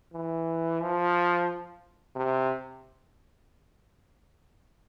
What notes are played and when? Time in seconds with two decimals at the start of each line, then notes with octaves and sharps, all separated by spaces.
0.13 E3
0.81 F3
2.15 C3